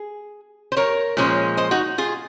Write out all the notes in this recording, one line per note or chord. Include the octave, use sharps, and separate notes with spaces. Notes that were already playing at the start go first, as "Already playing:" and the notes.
Already playing: G#4
C5
A#4 C#5
A#2 F3 G#3 C#4
C5 D#5
D#4 F#4
F4 G#4